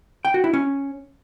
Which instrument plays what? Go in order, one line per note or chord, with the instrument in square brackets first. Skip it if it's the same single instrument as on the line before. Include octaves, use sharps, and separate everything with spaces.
[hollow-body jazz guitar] G5
F#4
E4
C#4